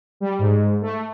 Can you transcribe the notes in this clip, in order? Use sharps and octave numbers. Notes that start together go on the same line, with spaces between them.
G3
G#2
A3